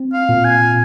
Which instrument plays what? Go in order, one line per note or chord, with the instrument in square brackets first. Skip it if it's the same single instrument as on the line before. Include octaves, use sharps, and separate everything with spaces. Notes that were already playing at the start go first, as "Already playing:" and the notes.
Already playing: [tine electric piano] C4
[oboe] F5
[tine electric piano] A#2
[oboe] G#5